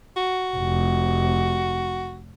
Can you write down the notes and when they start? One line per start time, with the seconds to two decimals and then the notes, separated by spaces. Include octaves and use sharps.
0.17 F#4
0.56 F1